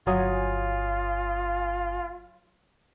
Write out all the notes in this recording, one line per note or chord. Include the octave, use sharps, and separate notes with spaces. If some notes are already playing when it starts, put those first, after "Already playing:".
G1 F#3 F4 G#5 D#6